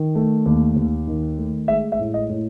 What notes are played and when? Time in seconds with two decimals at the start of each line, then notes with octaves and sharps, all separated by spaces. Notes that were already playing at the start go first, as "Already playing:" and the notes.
Already playing: D#3
0.15 A3
0.46 D#2
0.76 D#2
1.07 D#3
1.38 A3
1.68 G#3 E5
1.92 E5
1.99 A2
2.14 D#5
2.30 A2